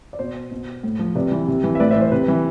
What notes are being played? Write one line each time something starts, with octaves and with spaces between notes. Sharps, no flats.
D5
B2 C5
B2
A2
F3
C3 B4 D5
E3
C3
E3
E5
A2 B4 D5
C5 E5
E3
C5
C3 B4
E3